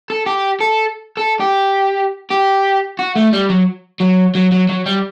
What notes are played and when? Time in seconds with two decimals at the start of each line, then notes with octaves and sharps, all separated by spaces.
0.10 A4
0.26 G4
0.60 A4
1.17 A4
1.40 G4
2.30 G4
2.99 F#4
3.16 A3
3.33 G3
3.50 F#3
4.00 F#3
4.35 F#3
4.52 F#3
4.69 F#3
4.86 G3